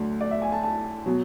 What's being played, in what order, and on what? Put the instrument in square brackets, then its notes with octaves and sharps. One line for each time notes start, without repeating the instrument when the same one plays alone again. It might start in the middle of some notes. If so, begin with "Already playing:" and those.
Already playing: [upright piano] D2 D3 F#3
D5
E5
G#5
A5
A5
B2 F#3